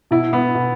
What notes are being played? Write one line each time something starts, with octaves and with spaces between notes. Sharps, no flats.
B2 E4
B3
B2